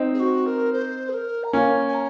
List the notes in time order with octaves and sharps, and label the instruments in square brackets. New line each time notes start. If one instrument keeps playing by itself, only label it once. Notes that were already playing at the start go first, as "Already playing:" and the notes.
Already playing: [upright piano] C4 D#4
[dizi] G#4
F#4
A#4
C5
G#4
A#4
A#5
[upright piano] A#3 C#4 [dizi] G#5
[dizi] G#5
A#5